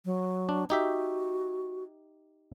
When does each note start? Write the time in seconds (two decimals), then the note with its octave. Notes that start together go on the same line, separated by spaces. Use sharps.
0.05 F#3
0.49 D4
0.70 D#4 F#4 G4 E5